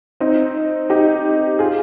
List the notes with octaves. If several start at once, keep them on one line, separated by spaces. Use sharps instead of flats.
C4 D#4
D#4 G4
F4 G#4